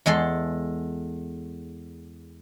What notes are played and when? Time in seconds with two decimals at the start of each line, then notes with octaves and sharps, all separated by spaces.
0.06 E2 G#3 A4 C6